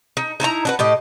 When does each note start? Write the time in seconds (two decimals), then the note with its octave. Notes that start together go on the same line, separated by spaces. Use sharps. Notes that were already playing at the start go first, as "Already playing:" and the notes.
0.17 D#4
0.40 D#4 E4 A5 A#5
0.65 D4 F#4 B4
0.79 A2 G4 D#5